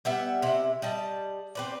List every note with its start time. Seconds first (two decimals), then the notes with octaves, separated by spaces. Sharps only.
0.05 G3 B3 E5
0.42 C3 E4
0.82 G3 D#5 A5
1.55 C4 B4 D5